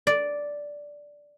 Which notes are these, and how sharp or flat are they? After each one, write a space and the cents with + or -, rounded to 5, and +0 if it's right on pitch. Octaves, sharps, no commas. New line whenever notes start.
D5 -5